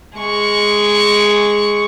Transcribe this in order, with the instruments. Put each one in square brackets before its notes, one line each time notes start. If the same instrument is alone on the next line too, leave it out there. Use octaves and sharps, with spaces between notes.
[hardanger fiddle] G#3 C#6